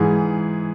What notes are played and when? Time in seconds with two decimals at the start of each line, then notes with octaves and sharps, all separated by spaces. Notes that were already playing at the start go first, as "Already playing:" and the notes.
Already playing: G#2 E3 G#4